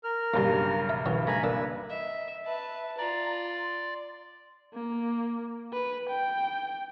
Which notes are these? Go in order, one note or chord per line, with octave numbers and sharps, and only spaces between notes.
A#4 F6
B1 G2 C#3 G3 A#3
E5
F#2 E3 F#3
A3 F5 G#5 A#5 B5
A#3 D4 B4 E6
D#5 E5
B4 E5 A5
F4 D5 A#5
C6
A#3
B4
G5